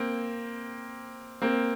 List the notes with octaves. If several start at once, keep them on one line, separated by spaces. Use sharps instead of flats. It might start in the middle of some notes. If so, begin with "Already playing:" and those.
Already playing: A#3 C4
A#3 C4